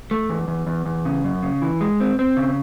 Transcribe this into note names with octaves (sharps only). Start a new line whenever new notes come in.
A3
E2
E2
E2
E2
C#3
F#2
C#3
E3
G#3
C4
C4
C#3